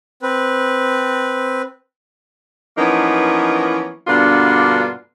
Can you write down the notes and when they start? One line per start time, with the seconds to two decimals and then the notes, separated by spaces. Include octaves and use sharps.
0.22 C4 B4
2.77 E3 F3 A#3 B3 C#4 D#4
4.07 G2 B2 D3 A#3 D4 F4